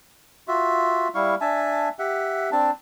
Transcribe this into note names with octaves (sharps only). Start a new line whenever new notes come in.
F4 F#4 E5
G3 E4 F5 C#6
D4 E5 G#5 A5
G4 E5 F#5
C4 D4 A5